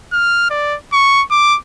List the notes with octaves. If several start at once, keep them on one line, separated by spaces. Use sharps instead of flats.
F6
D5
C#6
D6